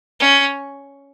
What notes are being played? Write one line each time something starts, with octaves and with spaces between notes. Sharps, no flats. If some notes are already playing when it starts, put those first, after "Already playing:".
C#4